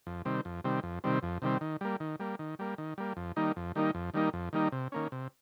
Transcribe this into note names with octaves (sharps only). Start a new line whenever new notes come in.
F2
C3 D#3 G3 C4
F2
C3 D#3 G3 C4
F2
C3 D#3 G3 C4
F2
C3 D#3 G3 C4
D#3
G3 A#3
D#3
G3 A#3
D#3
G3 A#3
D#3
G3 A#3
F2
D#3 G3 A#3 D#4
F2
D#3 G3 A#3 D#4
F2
D#3 G3 A#3 D#4
F2
D#3 G3 A#3 D#4
C3
D#3 A#3 C#4
C3